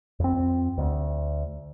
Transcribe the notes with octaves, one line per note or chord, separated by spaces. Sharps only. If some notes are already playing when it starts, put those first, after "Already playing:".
F2 C4
D2